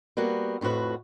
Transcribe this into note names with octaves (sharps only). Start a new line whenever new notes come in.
G3 A#3 B3 F#4
F2 A2 F3 F#4 B4